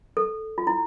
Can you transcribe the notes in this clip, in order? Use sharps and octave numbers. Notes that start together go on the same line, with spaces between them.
A4
F4
E4